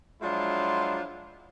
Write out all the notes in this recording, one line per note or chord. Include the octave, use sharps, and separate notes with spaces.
F3 F#3 G#3 D4 E4 F4